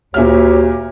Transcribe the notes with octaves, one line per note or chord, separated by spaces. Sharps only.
D2 A#2 G4 C#5 E5 F6